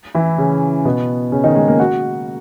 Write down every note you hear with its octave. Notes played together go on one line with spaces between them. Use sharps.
E3 E4
C#3 C#4
B2 B3
C#3 C#4
D#3 D#4
G#3 G#4
A#3 A#4
F#4 F#5